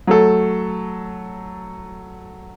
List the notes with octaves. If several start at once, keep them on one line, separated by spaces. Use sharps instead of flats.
F#3 A3 A4